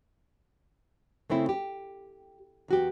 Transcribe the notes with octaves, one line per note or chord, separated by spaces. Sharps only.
C#3 A3 C4 E4
G4
E2 F#4 G4